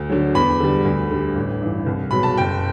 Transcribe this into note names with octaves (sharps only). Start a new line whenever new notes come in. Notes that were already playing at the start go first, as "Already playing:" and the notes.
Already playing: D2
D3 F#3
E2 B5
D3 G3
D2
D3 G3
A1
G2 E3
C2
B2 F#3 B5
A5
F#1 G5